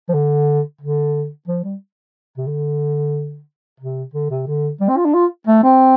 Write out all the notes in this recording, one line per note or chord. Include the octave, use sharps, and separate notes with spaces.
F3
D3
D3
F3
G3
C3
D3
C3
D3
C3
D3
G3
C4
F4
D4
F4
A3
C4